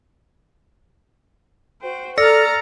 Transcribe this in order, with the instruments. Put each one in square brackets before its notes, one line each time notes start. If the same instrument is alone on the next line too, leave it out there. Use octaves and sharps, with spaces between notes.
[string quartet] F#4 C5 G5
[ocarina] A4 [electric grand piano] D5 [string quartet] A#5 F6 A6 [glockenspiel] E6 A#6 C#7